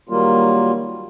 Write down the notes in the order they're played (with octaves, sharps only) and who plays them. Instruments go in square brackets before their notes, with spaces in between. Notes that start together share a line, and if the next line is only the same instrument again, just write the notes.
[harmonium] D#3 F#3 G3 A#3 F4